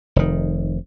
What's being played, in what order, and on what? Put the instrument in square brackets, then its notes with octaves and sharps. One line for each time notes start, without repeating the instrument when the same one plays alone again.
[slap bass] F1 D#3